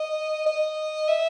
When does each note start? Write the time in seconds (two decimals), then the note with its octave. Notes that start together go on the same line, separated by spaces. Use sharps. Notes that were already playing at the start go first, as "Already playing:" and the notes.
Already playing: D#5
0.46 D#5
1.09 E5